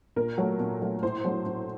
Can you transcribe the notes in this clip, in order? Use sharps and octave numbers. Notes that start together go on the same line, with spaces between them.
A#2 A#4
F#3 A3
A#2
F#3 A3
A2 C5
F#3 A3
A2